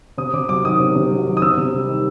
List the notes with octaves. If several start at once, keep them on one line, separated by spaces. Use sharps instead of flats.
C3 D#6
C3 D6
F#3 D6
D#3 D#6
C3
C3
F#3
D#3
D#6
C3 E6
C3
G3
D#3